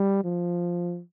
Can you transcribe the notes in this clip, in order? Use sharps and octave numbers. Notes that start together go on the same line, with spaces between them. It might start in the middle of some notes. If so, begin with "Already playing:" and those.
Already playing: G3
F3